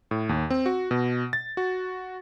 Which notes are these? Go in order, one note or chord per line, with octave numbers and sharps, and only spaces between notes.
A2
D#2
C4
F#4
B2
A6
F#4